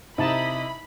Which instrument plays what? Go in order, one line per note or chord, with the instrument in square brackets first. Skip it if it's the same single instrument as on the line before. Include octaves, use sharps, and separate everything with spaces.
[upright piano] C3 [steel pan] D#4 A5 [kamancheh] E4 D#5 [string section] B5